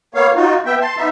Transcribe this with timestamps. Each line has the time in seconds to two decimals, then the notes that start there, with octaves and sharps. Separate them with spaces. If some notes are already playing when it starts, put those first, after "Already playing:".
0.15 A#3 B3 C#5 F5
0.35 D#4 F4 F#4
0.66 B3 E5 G5
0.81 A5 C6
0.97 B3 D#4 E5